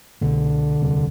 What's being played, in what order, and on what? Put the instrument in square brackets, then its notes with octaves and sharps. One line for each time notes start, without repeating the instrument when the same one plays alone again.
[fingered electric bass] C2 B2 A3 [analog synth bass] D3
[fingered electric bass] E1 D2 C3 G3